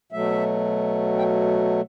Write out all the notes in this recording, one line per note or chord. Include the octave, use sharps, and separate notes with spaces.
B2 F#3 A3 E5
G5